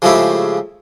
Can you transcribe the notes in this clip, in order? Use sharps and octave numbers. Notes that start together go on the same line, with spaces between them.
C#3 F3 G#3 A3 E4 G4